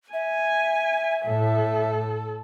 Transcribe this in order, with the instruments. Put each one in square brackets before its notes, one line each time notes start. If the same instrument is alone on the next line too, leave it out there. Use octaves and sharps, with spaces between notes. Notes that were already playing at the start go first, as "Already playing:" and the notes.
[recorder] E5 [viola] G#5
[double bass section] A2 [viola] A4